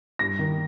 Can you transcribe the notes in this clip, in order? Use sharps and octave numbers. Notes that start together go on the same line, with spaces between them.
G2 A#6
D#3